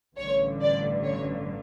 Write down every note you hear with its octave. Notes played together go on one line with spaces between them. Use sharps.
A1 G2 D3 C#5
D5
C#5